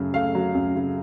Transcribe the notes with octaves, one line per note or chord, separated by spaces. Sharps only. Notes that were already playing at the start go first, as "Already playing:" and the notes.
Already playing: F#2 C#3 F#3 A3
A3 F5
F#3
F#2
C#3